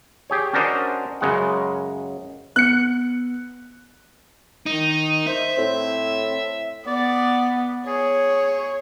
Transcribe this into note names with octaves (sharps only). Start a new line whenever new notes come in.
G4 G#4 C#5
C#4 D4 F#4 A#4 C5 D#5
F#2 C#3 G#3 F#5
B3 F#6 C#7
D#3 D#4
C5 E5
A2 C4
B3 D5
G#4 C#5